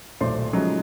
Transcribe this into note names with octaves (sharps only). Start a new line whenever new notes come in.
D#1 B1 A3 C5 D5 C6
C#3 F3 F#3 G#3 A3 D#4